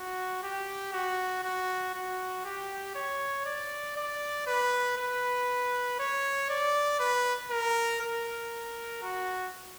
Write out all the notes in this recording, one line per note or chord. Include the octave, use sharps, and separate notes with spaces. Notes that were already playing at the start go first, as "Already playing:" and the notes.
Already playing: F#4
G4
F#4
F#4
F#4
G4
C#5
D5
D5
B4
B4
C#5
D5
B4
A#4
A#4
F#4